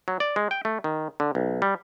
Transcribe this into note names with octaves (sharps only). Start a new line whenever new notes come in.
F#3
D5
G#3
G5
A3
D#3
D3
B1
G3